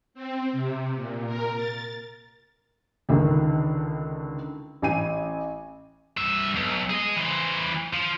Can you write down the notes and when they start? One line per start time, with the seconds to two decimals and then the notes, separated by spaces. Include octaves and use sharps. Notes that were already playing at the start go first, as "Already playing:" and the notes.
0.14 C4
0.52 C3
0.94 A#2
1.26 A#4
1.55 A6
3.09 C#2 D3 D#3
4.82 A1 G#5 D#7
6.18 G2 E5
6.56 B1
6.90 G#4 D#5
7.16 E3 C5
7.93 F3